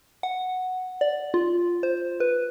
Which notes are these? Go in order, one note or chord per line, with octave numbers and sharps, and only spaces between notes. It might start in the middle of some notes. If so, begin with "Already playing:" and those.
F#5
D5
F4
C5
B4